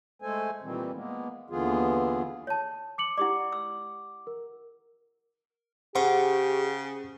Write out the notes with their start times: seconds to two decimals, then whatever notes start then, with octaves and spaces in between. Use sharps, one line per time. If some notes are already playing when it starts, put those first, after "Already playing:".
0.22 G#3 A3 A4 C5 G#5
0.62 A#2 D#3 E3 G3 C4
0.93 G#3 A#3 B3
1.50 D#2 D3 E3 B3 F4 G#4
2.47 C#5 A5
2.98 D6 C#7 F#7
3.18 E4 G4 D5 F#5 D6
3.52 E6
4.27 A#4
5.95 C#3 G4 G#4 C5 F#5 C#6